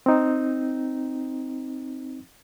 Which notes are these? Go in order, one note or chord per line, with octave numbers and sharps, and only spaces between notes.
C4 D#4